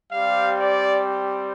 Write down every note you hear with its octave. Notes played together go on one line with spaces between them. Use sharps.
G3 C4 G4 F5
D5